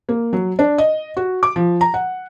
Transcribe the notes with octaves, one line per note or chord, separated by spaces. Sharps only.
A#3
F#3
D4
D#5
F#4
D6
F3
A#5
F#5